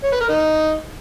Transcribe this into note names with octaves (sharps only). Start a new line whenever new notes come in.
C#5
B4
A#4
D#4